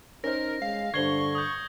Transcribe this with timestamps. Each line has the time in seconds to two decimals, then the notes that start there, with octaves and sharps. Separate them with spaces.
0.24 C#4 D#4 A#4 C5 A#6
0.62 G#3 F5
0.94 G2 D3 C5 C#6 G#6 C7 G7
1.35 D#6 G6